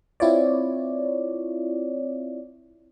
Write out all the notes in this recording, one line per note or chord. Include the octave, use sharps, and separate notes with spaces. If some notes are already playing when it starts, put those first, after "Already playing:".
C4 E4 F4 C#5 D5